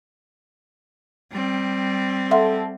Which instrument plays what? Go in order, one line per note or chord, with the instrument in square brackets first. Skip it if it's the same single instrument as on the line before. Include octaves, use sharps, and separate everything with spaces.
[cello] G3 C4
[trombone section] A4 [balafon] E5 F#5 C6